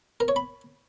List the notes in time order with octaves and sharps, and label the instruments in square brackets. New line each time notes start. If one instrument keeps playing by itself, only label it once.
[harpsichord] A#4
C#5
B5